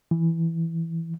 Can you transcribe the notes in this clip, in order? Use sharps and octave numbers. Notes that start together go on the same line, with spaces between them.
E3